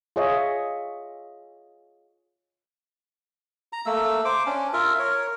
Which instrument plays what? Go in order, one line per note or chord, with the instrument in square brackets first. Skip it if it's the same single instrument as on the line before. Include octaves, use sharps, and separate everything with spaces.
[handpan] F4 G#4 C#5 D#5 E5
[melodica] A#5
A3 A#3 E6
C5 D6
C#4 D4
F4 A#4 E5
A#4 C#5